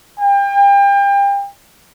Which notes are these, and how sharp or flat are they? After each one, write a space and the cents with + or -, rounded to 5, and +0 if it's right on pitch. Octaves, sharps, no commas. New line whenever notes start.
G5 +35